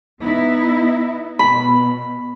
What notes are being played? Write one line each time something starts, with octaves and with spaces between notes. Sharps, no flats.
B3 D#4 E4
B2 B5